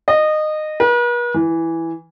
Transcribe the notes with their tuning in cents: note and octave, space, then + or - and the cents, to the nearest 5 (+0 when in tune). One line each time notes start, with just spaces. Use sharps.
D#5 -20
B4 -45
E3 +0